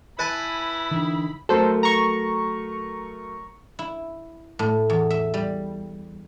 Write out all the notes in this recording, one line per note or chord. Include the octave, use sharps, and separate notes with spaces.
E4 B4 G#5 A5 B5
D3 E3 D#4
F#3 A3 A4 A#4 C5
A#5 C#6
E4
A2
E2
E5
G3